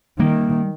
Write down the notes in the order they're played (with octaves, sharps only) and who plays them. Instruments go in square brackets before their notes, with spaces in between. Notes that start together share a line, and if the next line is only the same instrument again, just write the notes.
[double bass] D#3 [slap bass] G3 A#3